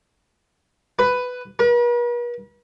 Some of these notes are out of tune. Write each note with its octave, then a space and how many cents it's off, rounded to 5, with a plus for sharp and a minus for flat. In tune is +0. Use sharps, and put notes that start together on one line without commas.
B4 +10
B4 -45